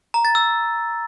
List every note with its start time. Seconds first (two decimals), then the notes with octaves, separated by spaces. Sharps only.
0.14 A#5
0.25 A6
0.35 E6